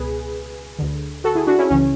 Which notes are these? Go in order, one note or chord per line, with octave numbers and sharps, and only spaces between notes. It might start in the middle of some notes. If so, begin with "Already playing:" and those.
Already playing: C#2 B2 G#4 B4
D2 D3
F#4 A4
E4 G#4
D4 F#4
C#4 E4
C#2 C#3 E3 C#4